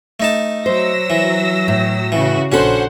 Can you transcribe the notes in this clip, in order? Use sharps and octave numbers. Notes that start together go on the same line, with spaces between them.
A3 D#4 A5
F#3 C5 E6 A#6
E3
A2
C#3 E3 F#4
A#1 C#4 D4 F#4 A4 C5 F#5 B5